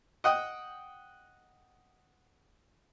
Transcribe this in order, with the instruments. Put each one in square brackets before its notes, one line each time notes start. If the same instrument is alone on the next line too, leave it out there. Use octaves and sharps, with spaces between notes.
[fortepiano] D#5 F#5 G5 D#6